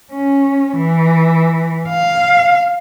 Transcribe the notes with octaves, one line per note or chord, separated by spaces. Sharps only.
C#4
E3
F5